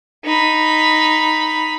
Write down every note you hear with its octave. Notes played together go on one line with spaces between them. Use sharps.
D#4 B5